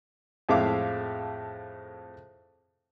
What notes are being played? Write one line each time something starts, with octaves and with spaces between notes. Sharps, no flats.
F2 A2 G#3 E5 F5 D6